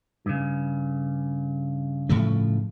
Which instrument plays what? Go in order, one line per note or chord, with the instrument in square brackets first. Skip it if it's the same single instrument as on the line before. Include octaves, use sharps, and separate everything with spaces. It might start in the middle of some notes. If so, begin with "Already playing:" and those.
[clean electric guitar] G2 C#3
[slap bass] A2 F3 A3